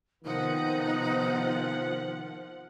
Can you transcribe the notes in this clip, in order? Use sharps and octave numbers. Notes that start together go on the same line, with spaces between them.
C3 D#3 F3 B3 D#4 F#5